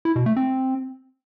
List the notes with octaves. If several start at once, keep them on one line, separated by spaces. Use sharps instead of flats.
E4
B2
A3
C4